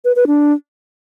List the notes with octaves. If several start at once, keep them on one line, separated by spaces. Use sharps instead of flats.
B4
B4
D4